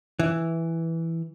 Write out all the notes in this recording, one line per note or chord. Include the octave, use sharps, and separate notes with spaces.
E3